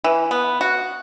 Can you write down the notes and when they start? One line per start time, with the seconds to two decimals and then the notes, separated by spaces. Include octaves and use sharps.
0.04 E3
0.31 B3
0.61 F#4